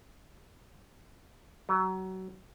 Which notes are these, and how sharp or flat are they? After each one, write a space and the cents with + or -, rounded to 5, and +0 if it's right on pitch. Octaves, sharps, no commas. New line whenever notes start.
F#3 +25